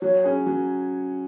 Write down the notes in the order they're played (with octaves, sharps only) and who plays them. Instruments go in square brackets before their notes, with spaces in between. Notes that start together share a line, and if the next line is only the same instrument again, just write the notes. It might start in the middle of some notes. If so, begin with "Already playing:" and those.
[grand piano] F#3 [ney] C#5
[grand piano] C#4 G#4
F#3